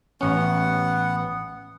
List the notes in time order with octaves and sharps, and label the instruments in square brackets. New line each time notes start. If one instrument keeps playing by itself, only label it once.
[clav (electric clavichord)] A1 C#4 [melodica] B3 F#5